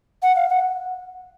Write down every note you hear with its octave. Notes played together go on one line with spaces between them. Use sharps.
F#5
F5
F#5